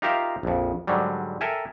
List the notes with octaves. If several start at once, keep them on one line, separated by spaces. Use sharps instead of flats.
D#4 F4 G4 A#4 E5 F5
A#1 F2
G#2 D3 F#3 G3
A4 A#4 E5 G5 G#5